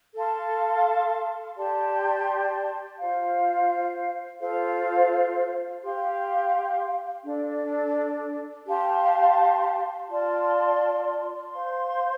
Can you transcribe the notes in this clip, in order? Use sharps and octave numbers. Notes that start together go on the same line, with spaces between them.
A4 F5 A5 C6
G4 D5 A5 C6
F4 C5 F5
F4 A4 C5 F5
G4 F5 C6
D4 A4 D5
G4 F5 A5 C6
F4 D5 A5 C6
C5 F5 C6